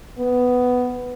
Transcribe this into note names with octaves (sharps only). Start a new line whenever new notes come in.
B3